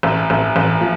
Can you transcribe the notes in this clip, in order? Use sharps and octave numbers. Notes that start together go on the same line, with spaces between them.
A1
A1
A1
F3